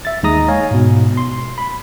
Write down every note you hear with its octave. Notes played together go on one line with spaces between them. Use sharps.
E5 A6
D#2 G#3 D#4 A#5 D#6 A#6
C#5 F5 G#5
G#2 B2
C6
B5